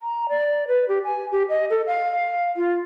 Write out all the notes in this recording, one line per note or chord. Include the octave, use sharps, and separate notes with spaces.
A#5
D5
B4
G4
G#5
G4
D#5
A4
F5
F4